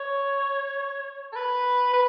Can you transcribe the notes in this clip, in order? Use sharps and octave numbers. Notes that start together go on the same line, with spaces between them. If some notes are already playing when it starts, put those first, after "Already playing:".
Already playing: C#5
A4
B4
B4